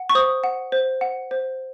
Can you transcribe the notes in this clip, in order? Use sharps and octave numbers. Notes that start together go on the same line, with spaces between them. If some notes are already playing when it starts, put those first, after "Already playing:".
Already playing: F#5
C#6
C5 D#6
F#5
C5
F#5
C5